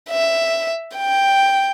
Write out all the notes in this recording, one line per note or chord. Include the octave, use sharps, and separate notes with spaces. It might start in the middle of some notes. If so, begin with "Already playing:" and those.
E5
G5